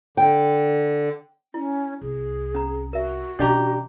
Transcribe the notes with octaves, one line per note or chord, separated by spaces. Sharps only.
D3 G5
C#4 E4
C2 G#4
C#4 A#5
F#4 A#4 E5
B2 E3 C#4 D4 G4 D#5 A#5 D6